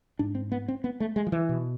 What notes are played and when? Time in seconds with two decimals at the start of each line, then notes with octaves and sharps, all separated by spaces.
0.19 G#2 D4
0.35 C4
0.52 B3
0.68 C4
0.84 B3
1.00 A3
1.16 G#3
1.27 F3
1.32 E3
1.49 B2